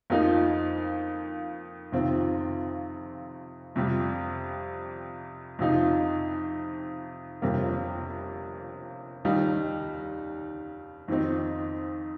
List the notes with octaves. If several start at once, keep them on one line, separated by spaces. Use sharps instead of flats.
F2 F3 A#3 D#4
F2 C3 D#3 C4 F4
F2 C3 G3
F2 C3 F3 D#4
G1 F2 C3 G3 A#3
D#2 D#3 G3 D#4
F2 D#3 C4 D#4